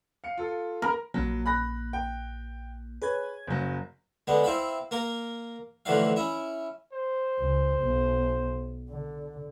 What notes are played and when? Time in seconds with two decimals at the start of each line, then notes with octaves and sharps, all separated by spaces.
0.24 F5 C#7
0.38 F4 A4
0.82 A#4 B5
1.14 A#1 F#3 A#3
1.46 B5 F#6 A#6
1.93 G5
3.02 G#4 B4 C#5 G#6
3.47 F#1 F#3
4.27 D3 G#3 B3
4.43 C4 E4 F5 B5
4.91 A#3 A#4
5.85 A1 F2 D3 E3 F#3 F5
6.16 C#4 E4
6.93 C5
7.39 C#2
7.81 B1
8.90 D3